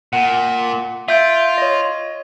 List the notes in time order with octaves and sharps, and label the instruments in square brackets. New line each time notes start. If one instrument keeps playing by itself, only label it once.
[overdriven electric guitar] A#2 [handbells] F#5
[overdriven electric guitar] F4 [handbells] E5 G6 D7
[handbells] C#5 D#5